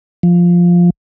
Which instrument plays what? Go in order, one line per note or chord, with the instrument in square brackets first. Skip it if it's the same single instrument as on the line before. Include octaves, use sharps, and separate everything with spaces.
[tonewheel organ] F3